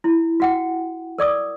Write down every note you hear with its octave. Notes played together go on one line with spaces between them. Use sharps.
E4
F#4 F#5 G5
A#4 D5 D6 D#6